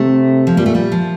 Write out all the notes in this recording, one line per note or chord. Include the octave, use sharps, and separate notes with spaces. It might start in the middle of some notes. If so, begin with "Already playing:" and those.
Already playing: C3 A3
F3
A#2 G3
A3
G3
F3